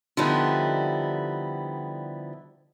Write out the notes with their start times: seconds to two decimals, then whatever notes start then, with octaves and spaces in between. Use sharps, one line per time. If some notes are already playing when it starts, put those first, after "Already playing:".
0.17 D3 F3 G3 B3 D#4 E4